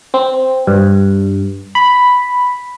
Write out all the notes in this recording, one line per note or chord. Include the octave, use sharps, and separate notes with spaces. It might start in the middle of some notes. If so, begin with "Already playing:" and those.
C4
G2
B5